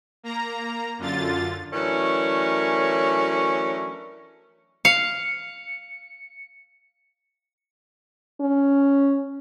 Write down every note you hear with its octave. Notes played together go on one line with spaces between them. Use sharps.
A#3 A#5
F#2 D3 F4 A6
E3 F#3 A3 C#4 D4 A#4
F5 C#7
C#4